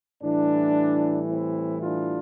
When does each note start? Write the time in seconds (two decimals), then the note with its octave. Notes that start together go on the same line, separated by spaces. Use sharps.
0.22 A2 E3 G3 D4
1.28 C4 E4
1.81 D4 F4